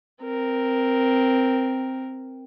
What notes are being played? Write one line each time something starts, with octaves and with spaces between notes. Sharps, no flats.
C4 A#4